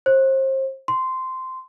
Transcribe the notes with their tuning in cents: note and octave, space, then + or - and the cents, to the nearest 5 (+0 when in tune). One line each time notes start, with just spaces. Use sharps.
C5 +30
C6 -10